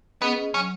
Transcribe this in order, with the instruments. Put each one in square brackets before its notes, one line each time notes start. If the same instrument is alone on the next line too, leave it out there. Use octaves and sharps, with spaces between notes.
[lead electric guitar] B3 [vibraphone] C#4 G#4 D#5
[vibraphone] F#3 [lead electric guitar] C#4